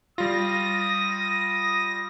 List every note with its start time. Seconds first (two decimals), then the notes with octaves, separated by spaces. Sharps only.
0.18 G3 F4 D#6 A#6